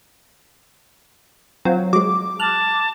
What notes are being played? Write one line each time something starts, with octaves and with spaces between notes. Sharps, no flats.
F#3 C4 F4
F#3 G#3 D6
A5 F6 F#6